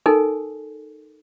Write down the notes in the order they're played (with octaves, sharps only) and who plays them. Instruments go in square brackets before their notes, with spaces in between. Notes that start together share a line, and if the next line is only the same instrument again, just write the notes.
[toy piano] D#4 A4 A#4 G#5